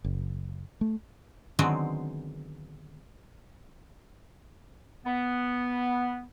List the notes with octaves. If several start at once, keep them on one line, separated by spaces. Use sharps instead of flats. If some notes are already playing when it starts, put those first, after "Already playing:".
F#1
A3
D3 D#3 F#3 G#3 B3 C4
B3